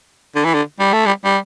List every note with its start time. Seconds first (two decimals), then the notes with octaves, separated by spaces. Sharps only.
0.35 D3
0.44 E3
0.54 D3
0.79 G3
0.93 A3
1.06 G3
1.24 G3